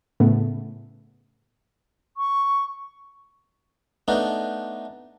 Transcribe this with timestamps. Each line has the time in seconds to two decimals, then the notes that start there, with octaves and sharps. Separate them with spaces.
0.20 A2 C#3 A3 B3
2.17 C#6
4.08 A3 B3 D4 D#4